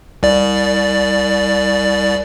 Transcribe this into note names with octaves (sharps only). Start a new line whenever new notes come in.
C2 D5